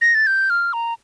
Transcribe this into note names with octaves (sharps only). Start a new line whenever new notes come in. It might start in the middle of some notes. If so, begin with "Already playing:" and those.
A#6
A6
G6
F6
A#5